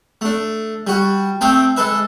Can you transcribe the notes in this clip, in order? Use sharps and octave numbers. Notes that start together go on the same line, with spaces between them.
A3 D4
G3 F#4
A3 C4 E5 F5 G5 D#6
G#3 A4 B4 E5